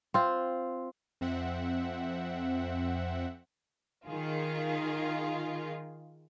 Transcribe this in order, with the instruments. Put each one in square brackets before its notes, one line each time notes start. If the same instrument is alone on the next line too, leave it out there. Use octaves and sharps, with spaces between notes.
[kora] C4 F4
[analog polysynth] F2 C4 E5 F#5
[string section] D#3 F4 G#4